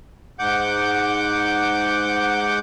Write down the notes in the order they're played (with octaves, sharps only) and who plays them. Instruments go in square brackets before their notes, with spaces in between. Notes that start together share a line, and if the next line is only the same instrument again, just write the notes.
[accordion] G#2 F#5 D6 G6